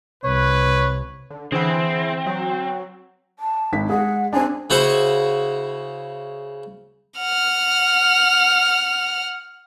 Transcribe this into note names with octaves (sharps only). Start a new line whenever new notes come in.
C2 B4 C#5
D3
D3 E3 C4 E4 G#4 F#5
F#3
A5
G#1 B6
G#3 G#4 F#5
C4 D4 G#5
C#3 E4 F#4 C5 F#5 C#6
F#5 F6